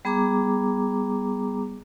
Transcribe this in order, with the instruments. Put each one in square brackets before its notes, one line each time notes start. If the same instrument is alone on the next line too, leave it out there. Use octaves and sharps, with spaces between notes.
[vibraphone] G3 B3 G#4 A#5 D6